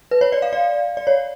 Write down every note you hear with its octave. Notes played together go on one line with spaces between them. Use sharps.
B4
C#5
D5
F5
D5
D5
C#5